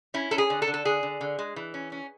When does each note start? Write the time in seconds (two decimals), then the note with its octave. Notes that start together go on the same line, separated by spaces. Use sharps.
0.14 C#4 E4
0.31 C#4 A4
0.38 G#4
0.50 D3
0.62 A4
0.68 D3
0.74 A4
0.85 D3 G#4
1.03 D3
1.21 D3
1.39 G#3
1.56 E3
1.74 C#4
1.92 C#4